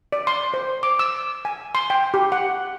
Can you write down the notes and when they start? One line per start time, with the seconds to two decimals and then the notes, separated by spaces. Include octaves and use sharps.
0.12 D5
0.27 C6
0.54 C5
0.83 D6
0.99 E6
1.45 G#5
1.75 C6
1.90 G5
2.14 G4
2.32 F#5